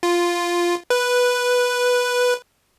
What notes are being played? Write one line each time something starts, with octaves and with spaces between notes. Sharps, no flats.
F4
B4